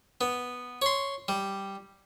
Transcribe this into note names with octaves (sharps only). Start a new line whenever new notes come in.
B3
C#5 C6
G3